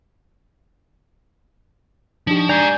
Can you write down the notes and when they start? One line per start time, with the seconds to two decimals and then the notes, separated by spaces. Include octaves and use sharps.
2.27 F3 D4 D#4 G4
2.49 G#3 D5 G#5 A#5 G6